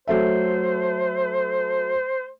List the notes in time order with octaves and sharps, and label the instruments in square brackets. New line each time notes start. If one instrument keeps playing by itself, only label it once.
[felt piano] F#3 A3 E5 [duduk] C5